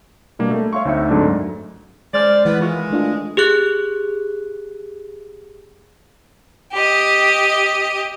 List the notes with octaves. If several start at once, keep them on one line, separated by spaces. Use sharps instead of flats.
B2 G3 A#3 D4
A3
C#5 E5 F5 C6 C#6
D2 C4 D#4 E5 C#7
G#2 D3 F#3 A3 D4
F#2
G#3 C#4 C5 D5 F6
E3 G#3 B3 B4
D#3 E3 G#3 F4 C#6 F6
A3 D4 F4
G4 G#4 F#6
G4 D#5